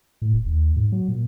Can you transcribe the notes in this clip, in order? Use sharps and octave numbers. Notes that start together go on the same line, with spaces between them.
A2
D#1
D#2
G#2
F#3
A#2